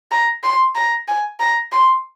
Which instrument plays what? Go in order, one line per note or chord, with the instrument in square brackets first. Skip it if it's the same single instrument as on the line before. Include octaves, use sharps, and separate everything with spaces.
[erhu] A#5
C6
A#5
G#5
A#5
C6